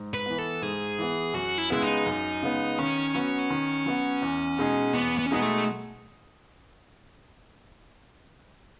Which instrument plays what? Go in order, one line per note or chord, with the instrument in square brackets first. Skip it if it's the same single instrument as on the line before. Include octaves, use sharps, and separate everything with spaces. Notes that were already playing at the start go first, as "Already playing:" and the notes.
Already playing: [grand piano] G#2
[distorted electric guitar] B4
[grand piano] E3 B3
[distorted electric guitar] A4
[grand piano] G#2 [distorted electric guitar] G#4
[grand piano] E3 B3
[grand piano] F#2 [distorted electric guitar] F#4
[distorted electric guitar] E4
[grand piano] C#3 G#3 B3 [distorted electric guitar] E4
[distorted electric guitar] D#4
[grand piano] F#2
C#3 G#3 B3
[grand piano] D#3 [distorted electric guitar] C#4
[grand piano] F#3 B3 F#4
D#3
F#3 B3 F#4
E2
B2 G#3 D#4 G#4
[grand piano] E2 [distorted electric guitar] B3
[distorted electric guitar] B3
C#4
[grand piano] B2 G#3 D#4 G#4 [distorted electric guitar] B3
[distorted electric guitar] A3